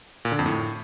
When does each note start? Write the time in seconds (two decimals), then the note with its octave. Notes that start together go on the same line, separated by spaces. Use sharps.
0.25 A#2
0.32 D3
0.39 F2
0.46 A2